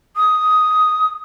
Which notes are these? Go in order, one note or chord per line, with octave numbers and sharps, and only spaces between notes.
D#6